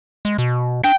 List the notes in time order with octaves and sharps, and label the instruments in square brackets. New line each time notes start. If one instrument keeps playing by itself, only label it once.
[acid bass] G#3
B2
[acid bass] D4 [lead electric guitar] G5